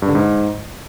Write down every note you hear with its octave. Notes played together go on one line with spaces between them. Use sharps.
G2
D3
G#2